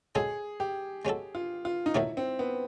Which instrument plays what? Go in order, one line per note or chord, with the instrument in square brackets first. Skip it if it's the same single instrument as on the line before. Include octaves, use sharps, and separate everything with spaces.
[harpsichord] G#3 C#4 F#4 A4 [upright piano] G#4
[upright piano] G4
[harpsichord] G#3 C#4 F#4 A4
[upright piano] F4
F4
D#4
[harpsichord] D#3 F#3 A3 C#4 F#4 [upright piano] E4
[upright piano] C4
B3